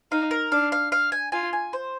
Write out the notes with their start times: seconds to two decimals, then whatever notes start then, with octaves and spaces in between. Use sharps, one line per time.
0.11 D#4 F5
0.31 A#4
0.52 D4 F5
0.72 F5
0.92 F5
1.12 G#5
1.32 F4 G#5
1.53 G#5
1.73 C5